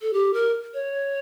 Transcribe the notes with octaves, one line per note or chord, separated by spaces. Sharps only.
A4
G4
A#4
C#5